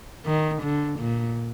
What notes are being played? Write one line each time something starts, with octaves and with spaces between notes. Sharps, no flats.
D#3
D3
A#2